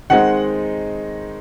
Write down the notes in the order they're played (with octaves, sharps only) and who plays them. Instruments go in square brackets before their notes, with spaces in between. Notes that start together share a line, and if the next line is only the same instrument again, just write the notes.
[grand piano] D#3 G#3 C4 D#4 F#5